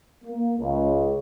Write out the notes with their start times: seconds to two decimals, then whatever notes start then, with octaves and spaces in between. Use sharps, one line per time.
0.25 A#3
0.58 C#2